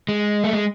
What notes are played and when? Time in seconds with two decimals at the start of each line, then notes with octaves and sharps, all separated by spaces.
0.09 G#3
0.44 A3
0.53 G#3